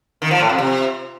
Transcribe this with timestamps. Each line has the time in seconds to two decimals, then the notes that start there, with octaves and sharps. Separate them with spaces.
0.22 D#3
0.31 F3
0.40 A2
0.49 F2
0.58 C3